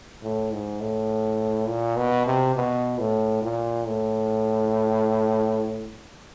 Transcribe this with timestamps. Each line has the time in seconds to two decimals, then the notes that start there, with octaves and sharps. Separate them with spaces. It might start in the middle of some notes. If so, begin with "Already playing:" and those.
0.22 A2
0.52 G#2
0.81 A2
1.68 A#2
1.97 B2
2.26 C3
2.56 B2
2.99 A2
3.42 A#2
3.86 A2